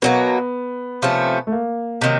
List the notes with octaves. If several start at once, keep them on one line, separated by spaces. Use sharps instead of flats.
B2 F#3 A#3 B3
C3 F3 A3 C#4
A3
A#3
C3 D#3 F#3